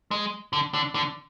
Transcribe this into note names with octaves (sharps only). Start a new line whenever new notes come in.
G#3
D3
D3
D3